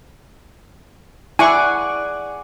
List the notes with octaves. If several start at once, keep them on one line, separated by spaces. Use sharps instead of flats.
E4 G#4 D5 F#5 G#5 C#6